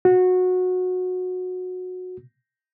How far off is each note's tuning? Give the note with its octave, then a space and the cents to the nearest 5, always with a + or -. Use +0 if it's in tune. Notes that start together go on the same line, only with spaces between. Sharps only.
F#4 -15